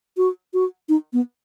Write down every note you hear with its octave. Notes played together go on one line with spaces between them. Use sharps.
F#4
F#4
D#4
B3